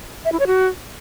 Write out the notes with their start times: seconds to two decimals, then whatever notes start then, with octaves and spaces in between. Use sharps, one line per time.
0.25 E5
0.32 E4
0.39 C#5
0.47 F#4